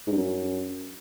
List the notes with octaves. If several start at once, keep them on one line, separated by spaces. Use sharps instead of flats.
G#2
G2
F#2